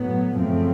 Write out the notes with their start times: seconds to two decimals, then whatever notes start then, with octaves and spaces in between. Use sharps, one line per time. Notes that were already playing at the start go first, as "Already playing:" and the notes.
Already playing: A2 F#3 B3
0.36 F#2 C#3 F3 A3 C4